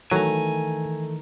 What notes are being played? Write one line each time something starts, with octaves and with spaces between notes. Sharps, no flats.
D#3 E3 F#3 A3 G#5 A#5